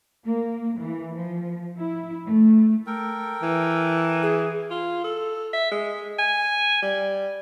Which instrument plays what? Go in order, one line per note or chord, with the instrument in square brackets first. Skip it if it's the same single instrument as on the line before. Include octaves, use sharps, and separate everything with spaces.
[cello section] A#3
E3
F3
E4
A3
[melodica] A4 A#4 G5
[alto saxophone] E3
[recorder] G#4
[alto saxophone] F4
A4
E5
G#3
G#5
G3